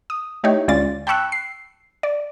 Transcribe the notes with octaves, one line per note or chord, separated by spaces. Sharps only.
D#6
A3 D#4 E4 G4 C#5
D2 G#3 C#4 F4 D5 A6
G5 A5 B5 C#6 E6 F#6
C7
D5